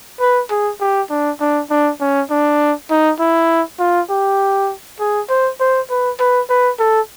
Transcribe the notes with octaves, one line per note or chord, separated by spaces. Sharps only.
B4
G#4
G4
D4
D4
D4
C#4
D4
D#4
E4
F4
G4
G#4
C5
C5
B4
B4
B4
A4